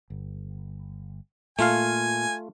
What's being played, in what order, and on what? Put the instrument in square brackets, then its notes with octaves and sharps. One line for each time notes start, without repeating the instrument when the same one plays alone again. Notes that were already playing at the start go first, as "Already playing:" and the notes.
[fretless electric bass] G1
[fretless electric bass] A#2 [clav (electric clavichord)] A3 F4 F5 [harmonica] G#5